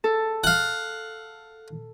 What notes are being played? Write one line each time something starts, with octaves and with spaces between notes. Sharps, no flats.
A4
F5 F#5